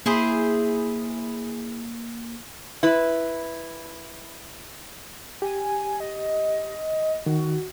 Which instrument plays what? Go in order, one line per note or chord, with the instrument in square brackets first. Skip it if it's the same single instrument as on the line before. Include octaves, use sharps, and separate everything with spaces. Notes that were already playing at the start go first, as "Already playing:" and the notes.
[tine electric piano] A#3 [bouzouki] E4 G#4 C5
[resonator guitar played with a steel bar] E4 B4
[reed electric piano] G4 [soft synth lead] G#5
[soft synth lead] D#5
[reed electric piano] D#3 [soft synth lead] F#4